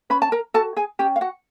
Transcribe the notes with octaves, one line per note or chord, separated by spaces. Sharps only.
C#4 B4 B5
A5
A#4 A#5
F#4 A4 A5
G#4 G#5
C#4 G4 G5
F5
F#4 F#5